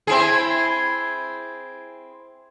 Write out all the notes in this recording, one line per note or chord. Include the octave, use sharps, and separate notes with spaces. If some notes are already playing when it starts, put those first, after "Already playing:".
C4 E4 G#4